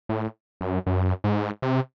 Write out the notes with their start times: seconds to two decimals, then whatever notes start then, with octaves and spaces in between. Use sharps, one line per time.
0.09 A2
0.61 F#2
0.86 F#2
1.24 G#2
1.62 C3